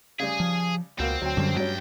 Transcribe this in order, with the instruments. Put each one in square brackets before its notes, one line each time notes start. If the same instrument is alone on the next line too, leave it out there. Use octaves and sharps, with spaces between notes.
[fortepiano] C#3 G3 [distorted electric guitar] G#4
[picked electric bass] F3
[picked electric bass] C#2 [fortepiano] B2 A#3 [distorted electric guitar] C4
[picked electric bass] D2 [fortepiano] F#3 G5
[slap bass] F#2 G3 [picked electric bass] D3
[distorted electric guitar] B1 G5 [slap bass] G2 [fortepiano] F#3 C#4 [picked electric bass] G3